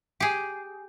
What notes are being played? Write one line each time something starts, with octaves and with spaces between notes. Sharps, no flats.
G4 G#4